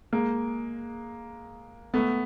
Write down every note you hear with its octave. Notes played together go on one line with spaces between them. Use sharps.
G#3 A#3
A3 B3